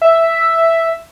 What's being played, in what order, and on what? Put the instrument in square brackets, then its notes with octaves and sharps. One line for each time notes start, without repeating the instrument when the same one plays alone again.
[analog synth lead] E5